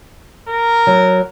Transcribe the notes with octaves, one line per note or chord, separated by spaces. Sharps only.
A#4
F#3